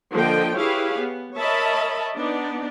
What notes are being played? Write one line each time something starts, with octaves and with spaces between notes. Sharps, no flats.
D3 F3 A#3 D4 D#5 G5
E4 G4 G#4 B4 C#5 F5
B3
A#4 C#5 D#5 E5 A5 B5
B3 D4 D#4 D5